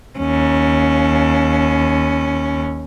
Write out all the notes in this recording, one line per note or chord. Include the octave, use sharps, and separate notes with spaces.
D#2 C#4